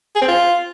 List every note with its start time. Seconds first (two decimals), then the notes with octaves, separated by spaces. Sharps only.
0.16 G#4
0.22 C4
0.28 F4